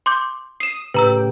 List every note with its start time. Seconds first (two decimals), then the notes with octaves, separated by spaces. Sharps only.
0.06 C6 D6 G6
0.60 D#6 C7 E7
0.94 A2 C#3 G4 B4 A#5 E6